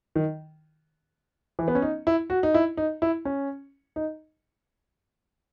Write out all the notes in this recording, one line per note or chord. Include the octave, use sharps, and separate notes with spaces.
D#3
E3
B3
C#4
D#4
E4
F#4
D#4
E4
D#4
E4
C#4
D#4